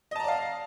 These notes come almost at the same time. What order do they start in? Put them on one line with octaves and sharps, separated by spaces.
D#5 A5 A#5 D5 F5